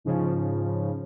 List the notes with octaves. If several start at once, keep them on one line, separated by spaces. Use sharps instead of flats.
G#2 C#3 F3